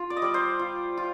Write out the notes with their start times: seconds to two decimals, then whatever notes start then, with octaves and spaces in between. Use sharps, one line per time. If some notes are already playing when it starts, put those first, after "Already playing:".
Already playing: F4
0.10 D5
0.17 D#5
0.22 G3 D5
0.34 C5
0.59 F4
0.97 F4